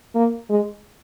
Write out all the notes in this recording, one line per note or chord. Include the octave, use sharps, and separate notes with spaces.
A#3
G#3